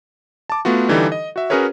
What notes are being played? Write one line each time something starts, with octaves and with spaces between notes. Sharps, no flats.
A5 D6
A3 B3 F4 F#4
D3 E3 G3 D#4 G4 A4
D#5
F#4 E5
C#4 F#4 G#4 A#4 B4 C#5